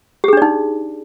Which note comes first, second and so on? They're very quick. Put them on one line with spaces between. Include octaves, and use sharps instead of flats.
G4 G#4 D4 D5 D#4